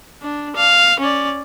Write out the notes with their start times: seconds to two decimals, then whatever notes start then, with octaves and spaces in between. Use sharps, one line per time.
0.23 D4
0.56 F5
0.99 C#4 D5